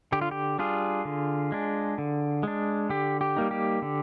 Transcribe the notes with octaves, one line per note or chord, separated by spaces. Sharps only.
D3 G4
F4
G4
G3 D4 F4 G#4
D3
G#3 D4
D3
G#3 D4
D3 G4
G4
G3 A#3 D#4
G4
D3